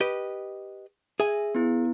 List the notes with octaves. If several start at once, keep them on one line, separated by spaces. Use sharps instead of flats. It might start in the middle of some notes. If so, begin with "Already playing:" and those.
G4 B4 D#5
G#4 E5 G#5
B3 E4